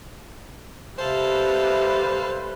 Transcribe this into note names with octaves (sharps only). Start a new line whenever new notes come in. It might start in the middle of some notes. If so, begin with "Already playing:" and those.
C3 G3 A4 B4 C5 F5